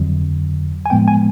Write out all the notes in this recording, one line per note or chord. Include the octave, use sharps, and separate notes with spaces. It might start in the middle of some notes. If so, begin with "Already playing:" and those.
Already playing: F2 D3 F#3
G#5
A2 F3 G#3 B3 G5
G#5